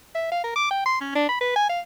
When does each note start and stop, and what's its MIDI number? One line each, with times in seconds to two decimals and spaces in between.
0.15 0.29 76
0.31 0.41 77
0.43 0.54 70
0.56 0.68 86
0.71 0.83 79
0.86 0.99 84
1.01 1.14 61
1.15 1.24 62
1.29 1.37 83
1.41 1.52 71
1.56 1.68 80
1.69 1.80 77